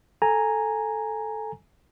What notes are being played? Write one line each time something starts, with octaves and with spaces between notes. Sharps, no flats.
A4 G#5 A#5